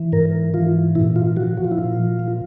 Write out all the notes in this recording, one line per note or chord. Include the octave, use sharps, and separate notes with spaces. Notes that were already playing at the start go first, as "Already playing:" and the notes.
Already playing: E3
G#2 A#4
E3 F4
A#2 E4
F4
F3 F#4
F#4
F4
E4
A#2 F4
F3